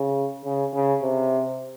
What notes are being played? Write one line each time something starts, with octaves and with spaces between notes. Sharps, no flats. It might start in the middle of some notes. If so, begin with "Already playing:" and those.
Already playing: C#3
C#3
C#3
C3